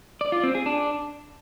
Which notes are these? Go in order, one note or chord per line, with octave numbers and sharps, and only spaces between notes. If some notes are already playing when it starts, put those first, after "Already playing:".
D5
F4
C4
G#4
D4